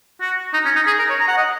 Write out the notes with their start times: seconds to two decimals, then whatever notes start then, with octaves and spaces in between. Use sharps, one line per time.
0.21 F#4
0.54 D#4
0.65 C#4
0.76 D#4
0.87 G#4
0.99 A#4
1.10 C#5
1.20 A#5
1.28 F#5
1.37 D#5